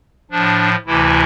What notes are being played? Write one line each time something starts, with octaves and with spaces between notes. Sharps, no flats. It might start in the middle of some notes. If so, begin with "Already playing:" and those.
A2 F3 D4
D2 C3 E3 E4